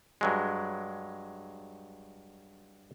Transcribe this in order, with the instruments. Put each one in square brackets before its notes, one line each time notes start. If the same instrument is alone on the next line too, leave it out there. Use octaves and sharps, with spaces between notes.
[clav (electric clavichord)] G2 F#3 G#3